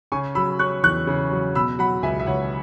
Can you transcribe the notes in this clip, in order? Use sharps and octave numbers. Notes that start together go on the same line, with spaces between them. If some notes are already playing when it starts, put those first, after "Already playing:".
C#3 G#5 C#6
F#3 B5 E6
C#4 C#6 F#6
E2 C#6 F#6
C#3
F#3
B2 B5 E6
F#3 F#5 B5
C#2 E5 G#5
E5
C#2 C#5 F#5